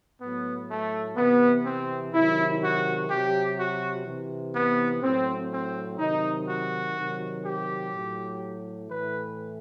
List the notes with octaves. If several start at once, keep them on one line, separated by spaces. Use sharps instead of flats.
A2 F#3 B3
A3
C3 E3 B3
C4
C3 D#3 F#3 E4
F#4
C3 F#3 G4
F#4
C3 E3
B3
A2 F#3 C4
C4
C3 D#3 F#3 D#4
F#4
C3 D#3 F#3
G4
A2 F#3
A2 E3 B4